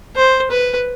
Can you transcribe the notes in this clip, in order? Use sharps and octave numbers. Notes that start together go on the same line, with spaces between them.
C5
B4